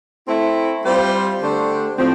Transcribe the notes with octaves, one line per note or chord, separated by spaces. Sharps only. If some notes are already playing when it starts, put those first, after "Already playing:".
A3 C4 E4
G3 C4 F4 C5
D3 A3 D4 G4 C5
A2 F3 C4